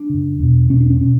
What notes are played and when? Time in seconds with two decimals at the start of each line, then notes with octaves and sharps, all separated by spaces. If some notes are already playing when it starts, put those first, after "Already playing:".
Already playing: D4
0.10 F#2 C#3
0.39 E2 B2
0.70 E2 B2 C#4
0.81 D4
0.90 C#4
1.01 B2 C#4